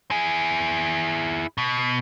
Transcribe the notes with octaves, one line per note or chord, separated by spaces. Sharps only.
E4 G#4
B2